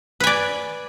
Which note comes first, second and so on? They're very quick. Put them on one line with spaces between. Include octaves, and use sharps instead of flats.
B4 G#5 D5